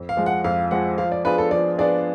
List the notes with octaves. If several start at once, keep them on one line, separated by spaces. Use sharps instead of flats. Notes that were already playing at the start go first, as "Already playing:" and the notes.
Already playing: F2
F5
F3 G#3
F#5
F2 F5
F3 G#3 F#5
F3 F5
D5
B3 D4 F4 G#4 B4
A4
F3 D5
B3 D4 F4 G#4 D5